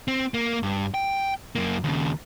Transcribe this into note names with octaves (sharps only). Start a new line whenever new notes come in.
C4
A#3
G2
G5
F#2 A#3
D#2 C#3